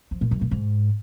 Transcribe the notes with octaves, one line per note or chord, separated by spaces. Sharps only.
F3
A#2
F#2
A#2
G#2